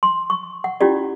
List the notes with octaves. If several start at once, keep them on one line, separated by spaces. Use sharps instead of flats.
C6
C#6
F#5
C#4 E4 F4 G4 D5